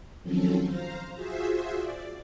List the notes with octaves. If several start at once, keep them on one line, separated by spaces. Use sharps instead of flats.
D#3 F3 F#3 C4 C#4 A4
C5 F5 A#5
F4 F#4 G#4 C5 E5
D5